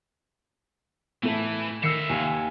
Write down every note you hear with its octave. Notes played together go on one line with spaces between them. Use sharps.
A2 E3 A3
D#3 A#4 E5 E6 C7 C#7
D#2 G#5